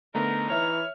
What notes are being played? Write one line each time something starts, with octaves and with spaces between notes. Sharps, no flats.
D3 A3 B3 D#4 A#4
E3 C#5 E5 F6